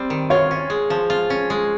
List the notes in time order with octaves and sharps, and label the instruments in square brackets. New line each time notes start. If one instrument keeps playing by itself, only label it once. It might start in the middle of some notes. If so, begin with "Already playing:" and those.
Already playing: [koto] G3 C4
D#3
[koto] F4 [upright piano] C#5
[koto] C#4
G#3
F3
F4
C#4
G#3